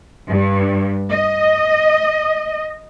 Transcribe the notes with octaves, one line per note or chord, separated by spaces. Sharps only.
G2
D#5